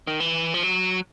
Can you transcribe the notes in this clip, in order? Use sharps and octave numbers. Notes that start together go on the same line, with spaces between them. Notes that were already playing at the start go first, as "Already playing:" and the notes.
D#3
E3
F3
F#3